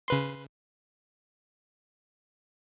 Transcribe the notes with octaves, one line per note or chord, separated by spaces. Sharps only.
C#3 B4 C6